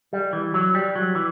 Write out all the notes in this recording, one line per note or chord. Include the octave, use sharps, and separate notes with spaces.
G3
E3
F#3
G3
F#3
E3